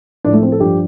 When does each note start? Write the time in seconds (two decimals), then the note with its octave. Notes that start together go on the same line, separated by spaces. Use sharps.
0.24 A2 F3 D4
0.33 A3
0.43 C4
0.52 A4
0.60 G2 F3 G4